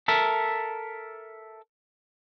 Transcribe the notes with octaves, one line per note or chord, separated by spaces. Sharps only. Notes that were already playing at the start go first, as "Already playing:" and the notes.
A4 A#4 E5